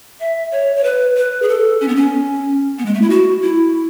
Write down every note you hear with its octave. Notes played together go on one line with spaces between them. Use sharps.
E5
C#5
C#5
B4
B4
G#4
A4
C#4
B3
C#4
B3
G#3
A3
E4
F#4
E4